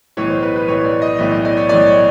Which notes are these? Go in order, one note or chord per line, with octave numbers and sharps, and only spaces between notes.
B1 A2 E3 C#5
C5
B4
B4
B1 A2 E3 C#5
D5
D#5
B1 A2 E3 E5
D#5
D5
C#5
B1 A2 E3 D5
C#5